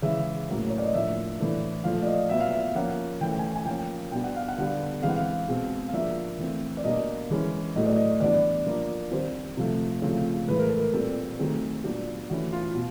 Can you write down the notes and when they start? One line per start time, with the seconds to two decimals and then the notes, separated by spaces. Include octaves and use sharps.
0.02 C#3 E3 G#3 E5
0.49 A2 F#3 A#3 C#4
0.70 C#5
0.78 D5
0.85 D#5
0.93 A2 F3 A#3 D4 E5
1.39 A2 E3 A3 D4
1.84 A#2 F3 A3 F5
2.02 D5
2.07 D#5
2.29 A#2 F#3 B3 E5
2.40 F5
2.51 E5
2.75 F3 A#3 C#4 F#5
3.21 E3 A3 C#4 G5
3.32 G5
3.39 G#5
3.44 G5
3.56 G#5
3.66 F3 A#3 C#4 G5
4.12 B2 G3 B3 D4 G5
4.24 F#5
4.36 F5
4.48 F#5
4.58 D3 G3 B3 D4
5.02 E3 G#3 C4 F5
5.09 F#5
5.16 F5
5.48 B2 G#3 C4
5.88 F5
5.93 F3 A#3 D4 E5
6.39 E3 A3 C4
6.77 D5
6.84 B2 G3 A#3 D4 D#5
7.30 E3 G#3 C#4
7.76 A2 F#3 A3 D#5
7.85 D5
7.96 D#5
8.20 E3 G3 B3 D4 D5
8.66 F3 A#3 D4
9.11 D#3 G3 C4 C5
9.57 C3 F3 A3
10.02 C#3 F3 A3 C4
10.48 A2 E3 G#3 B4
10.59 A#4
10.69 A4
10.79 A#4
10.93 A#2 G3 C4 A4
11.39 D#3 F#3 A3 C4 G#4
11.84 A#2 F#3 B3 D4 G4
12.29 E3 A3 C#4 F#4
12.53 F4
12.75 B2